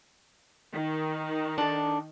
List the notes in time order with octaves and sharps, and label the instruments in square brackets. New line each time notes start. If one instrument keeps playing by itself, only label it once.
[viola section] D#3 D#4
[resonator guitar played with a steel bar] D4 A4